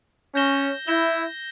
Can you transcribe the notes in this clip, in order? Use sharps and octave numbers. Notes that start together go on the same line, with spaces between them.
C#4 G6 A#6 E7 G7
E4 G6 A#6 E7 G7